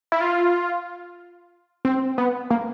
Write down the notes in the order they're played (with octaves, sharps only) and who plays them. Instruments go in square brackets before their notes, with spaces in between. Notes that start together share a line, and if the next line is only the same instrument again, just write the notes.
[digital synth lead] E4
F4
C4
B3
A#3